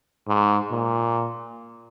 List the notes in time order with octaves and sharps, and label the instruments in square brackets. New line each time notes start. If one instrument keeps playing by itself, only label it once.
[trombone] G#2
A#2